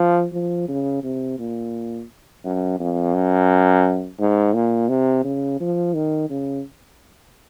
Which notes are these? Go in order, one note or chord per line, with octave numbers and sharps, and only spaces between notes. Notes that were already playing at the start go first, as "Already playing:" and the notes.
Already playing: F3
F3
C#3
C3
A#2
F#2
F2
F#2
G#2
A#2
C3
C#3
F3
D#3
C#3